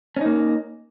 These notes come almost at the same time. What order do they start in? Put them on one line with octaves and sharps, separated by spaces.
C#4 D#4 A#3